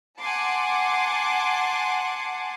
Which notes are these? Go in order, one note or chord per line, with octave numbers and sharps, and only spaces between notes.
F#5 G#5 A5 C6 D6